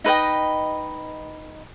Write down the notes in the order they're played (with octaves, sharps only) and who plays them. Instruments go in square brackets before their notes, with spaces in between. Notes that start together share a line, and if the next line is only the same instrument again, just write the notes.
[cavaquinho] D#4 B4 D#5 G5